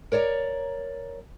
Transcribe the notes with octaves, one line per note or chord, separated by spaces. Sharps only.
A#4 C#5 D5 A5 A#5